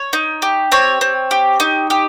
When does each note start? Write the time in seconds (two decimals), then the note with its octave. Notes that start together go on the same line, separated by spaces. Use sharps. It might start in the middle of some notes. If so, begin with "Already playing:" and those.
Already playing: C#5
0.13 D#4
0.42 G4
0.72 C4 C#5
1.01 C4
1.31 G4
1.60 D#4
1.90 G4